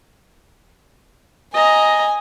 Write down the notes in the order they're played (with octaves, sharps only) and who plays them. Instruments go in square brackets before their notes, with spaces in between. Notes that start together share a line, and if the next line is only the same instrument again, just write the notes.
[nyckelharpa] D#5 A#5 [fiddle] G#5